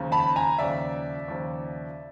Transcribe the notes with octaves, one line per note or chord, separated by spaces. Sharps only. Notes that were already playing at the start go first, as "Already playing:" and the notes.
Already playing: D#2 C#3 F3
A5 B5
G#5 A#5
D#2 C#3 F3 D5 E5
D#2 C#3 F3